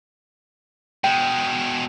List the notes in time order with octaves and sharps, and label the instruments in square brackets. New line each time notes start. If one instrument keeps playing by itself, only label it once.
[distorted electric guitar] B2 G#3 [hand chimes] G5